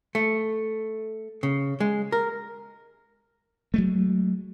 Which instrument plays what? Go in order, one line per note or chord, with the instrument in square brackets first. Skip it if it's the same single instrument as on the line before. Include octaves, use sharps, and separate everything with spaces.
[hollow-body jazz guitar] A3
C#3
G#3
A#4
[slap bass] F#3 G#3 A3